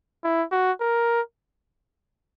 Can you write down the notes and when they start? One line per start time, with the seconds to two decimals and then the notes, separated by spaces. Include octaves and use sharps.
0.24 E4
0.52 F#4
0.81 A#4